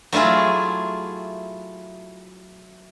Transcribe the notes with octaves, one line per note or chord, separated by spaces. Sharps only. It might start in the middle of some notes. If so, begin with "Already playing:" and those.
F#3 A3 E4 F4 G#4